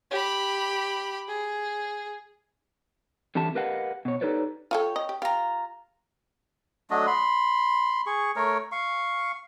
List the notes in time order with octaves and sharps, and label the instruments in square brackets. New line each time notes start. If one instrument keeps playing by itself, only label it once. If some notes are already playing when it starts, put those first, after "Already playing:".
[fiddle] G4 B5
G#4
[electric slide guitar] D3 E3 C4 G4 E5 A5
G4 A#4 B4 D#5 F5 F#5
B2 C#5
D#4 G4 A4 B4 C#5 D5
[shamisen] F4 F#4 A4 [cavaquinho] C#5 G5
[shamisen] D#5
G4
[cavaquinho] F4 A#5 [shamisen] G4
[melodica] F#3 A3 D4 D#5
B5 C6
G#4 C#6
A3 A#4 C#5
F5 C#6